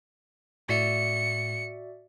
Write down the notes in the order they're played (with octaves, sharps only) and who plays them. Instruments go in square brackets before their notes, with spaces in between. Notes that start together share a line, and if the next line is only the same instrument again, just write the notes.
[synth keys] A2 [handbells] F#4 D5 E5 [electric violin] C#7